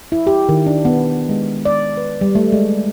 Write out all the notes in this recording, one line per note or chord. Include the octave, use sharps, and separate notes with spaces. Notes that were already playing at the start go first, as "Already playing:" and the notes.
E4
G4
D#3
D4
B3
G#3
D5
B4
G3
A3
G#3